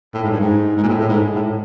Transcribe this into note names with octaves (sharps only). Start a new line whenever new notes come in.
A2
G#2
G2
G#2
G#2
A#2
A2
A2
G#2
G#2
A2